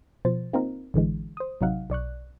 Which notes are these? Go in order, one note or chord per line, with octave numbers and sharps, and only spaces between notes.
B2 F3 C5 A6
A#3 C4 D#4 F4 A#4
A1 D3 E3 G#3
C5 D#6
A1 C3 F#3 D#4 F5 F#5
B1 D5 C#6 F#6